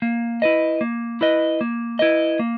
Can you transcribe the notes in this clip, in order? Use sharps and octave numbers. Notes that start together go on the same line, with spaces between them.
A#3
E4 B4 D#5
A#3
E4 B4 D#5
A#3
E4 B4 D#5
A#3